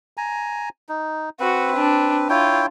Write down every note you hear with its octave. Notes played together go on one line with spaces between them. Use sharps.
G#5 A#5
D#4
C4 F#4 B4
D4
E4 F4 C#5 G5